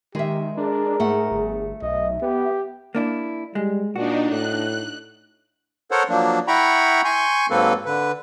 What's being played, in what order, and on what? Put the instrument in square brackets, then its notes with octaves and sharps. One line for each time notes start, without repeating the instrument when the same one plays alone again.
[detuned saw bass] D#3 [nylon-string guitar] G#3 E5 [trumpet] G4
[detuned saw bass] D4 [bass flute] G#4 [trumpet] A#4
[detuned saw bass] G#2 [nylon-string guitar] A3 F#5
[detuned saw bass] G1
[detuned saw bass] B1 [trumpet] D#5 [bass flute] E5
[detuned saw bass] B3 [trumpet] G4
[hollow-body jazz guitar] A#3 D4 E4
[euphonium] G3 [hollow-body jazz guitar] G#3
[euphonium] A#2 [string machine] D4 D#4 [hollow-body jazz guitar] F#4
[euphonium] A2 [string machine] F#6
[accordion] A4 A#4 C5 C#5 F#5
F3 F#3 A#3 D4
E4 F#5 G5 A#5 B5 C#6
G#5 C6 C#6 G6
G#2 F#3 A#3 C4 A4 B4
D3 B4